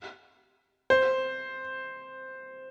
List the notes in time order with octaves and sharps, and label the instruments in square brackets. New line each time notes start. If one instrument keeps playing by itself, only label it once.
[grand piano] C5